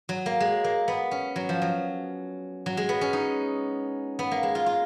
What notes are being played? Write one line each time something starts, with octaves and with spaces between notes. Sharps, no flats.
F#3
A#3
G#3
A#3
B3
C#4
F#3
F3
F#3
F#3
G#3
B3
C#4
D#4
B3
A#3
G#3
F4
F4